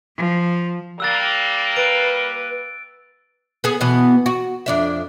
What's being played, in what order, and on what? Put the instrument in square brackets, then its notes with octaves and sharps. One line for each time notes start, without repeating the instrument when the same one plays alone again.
[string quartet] F3
[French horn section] G3 A#3 [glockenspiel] E6 F#6 A6
[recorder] B4 [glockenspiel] D7
[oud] B3 G#4
B2 E3 B3
F#4
F2 D4 E5